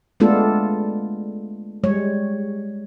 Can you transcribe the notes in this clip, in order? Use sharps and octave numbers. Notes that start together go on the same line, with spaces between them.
G#3 A3 B3 D4 F4 A4
G3 G#3 C#5